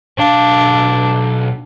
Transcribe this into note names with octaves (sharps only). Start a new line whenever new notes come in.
B1 D4 F5